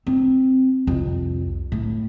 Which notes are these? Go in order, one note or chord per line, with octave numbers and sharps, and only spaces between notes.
C4
C2 F2
A2